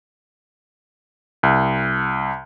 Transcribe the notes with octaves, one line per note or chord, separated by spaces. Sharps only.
C2